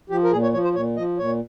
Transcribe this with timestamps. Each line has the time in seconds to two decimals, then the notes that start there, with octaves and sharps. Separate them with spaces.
0.10 F3 G4
0.24 A#4
0.32 A#2 G#4
0.43 C#5
0.53 F3 C#5
0.64 C5
0.75 A#2 C#5
0.97 F3 D#5
1.18 A#2 C#5